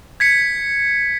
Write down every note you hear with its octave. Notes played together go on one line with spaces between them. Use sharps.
G#6 B6 C#7